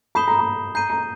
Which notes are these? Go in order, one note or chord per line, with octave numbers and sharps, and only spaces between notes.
B5 D#6 G6 C7 E7 G7
A#5
B5
A#5 G6 C7 D#7
A#5